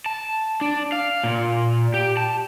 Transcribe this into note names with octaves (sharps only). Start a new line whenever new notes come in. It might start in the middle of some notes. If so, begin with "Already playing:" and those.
A5
D4
F5
A#2
G4
A5